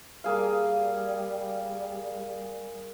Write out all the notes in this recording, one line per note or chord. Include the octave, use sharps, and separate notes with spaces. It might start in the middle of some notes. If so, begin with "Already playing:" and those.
G3 A#3 G#4 F5